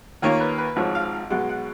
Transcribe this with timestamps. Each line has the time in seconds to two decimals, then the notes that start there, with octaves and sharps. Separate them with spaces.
0.22 D#2 D#3 A#3 F4 C#5
0.40 B4
0.58 B4
0.76 G#1 G#2 F3 C#5
0.95 F5
1.30 B1 B2 G#3 F#5
1.49 F#5